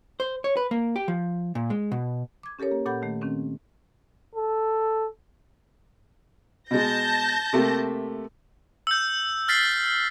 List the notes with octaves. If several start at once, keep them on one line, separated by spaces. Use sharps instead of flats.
C5
C#5
B4
A#3
G4
F3
A#2
G#3
B2
D6 G#6
C#4 G4 A4 A#4 C#5
A#3
A#2 A4 F#5 B5 G6
D#3 A3
D#3 C4 C#4
A4
B2 G#3 A5 G6 A#6
C3 A3 A#3
E6 G6
F6 A6 B6 C7